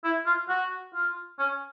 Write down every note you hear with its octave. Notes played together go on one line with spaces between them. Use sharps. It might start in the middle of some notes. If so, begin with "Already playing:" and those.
E4
F4
F#4
F4
C#4